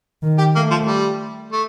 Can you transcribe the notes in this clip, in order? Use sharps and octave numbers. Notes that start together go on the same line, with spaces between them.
D#3
G4
A3 A#3
F3
G3
A3